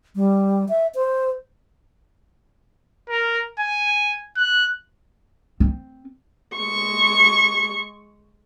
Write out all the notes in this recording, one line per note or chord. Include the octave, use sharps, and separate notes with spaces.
G3
E5
C5
A#4
G#5
F#6
C4
G#3 C#6